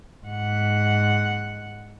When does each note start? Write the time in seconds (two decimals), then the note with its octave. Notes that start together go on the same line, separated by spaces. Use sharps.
0.24 G#2 F#5